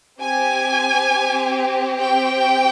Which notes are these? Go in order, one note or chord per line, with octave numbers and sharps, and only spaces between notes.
C4 G4 G#5
G5